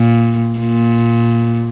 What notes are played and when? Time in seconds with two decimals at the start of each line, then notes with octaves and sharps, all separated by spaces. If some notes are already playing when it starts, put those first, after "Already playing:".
Already playing: A#2
0.59 A#2